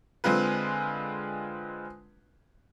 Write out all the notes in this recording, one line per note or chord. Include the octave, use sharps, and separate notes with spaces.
D3 G#3 C4 F4 B4